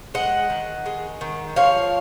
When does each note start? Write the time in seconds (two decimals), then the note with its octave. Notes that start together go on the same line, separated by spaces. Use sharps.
0.14 G#3 D#5 F#5
0.50 D#3
0.86 G#3
1.21 D#3
1.56 F3 C#5 F5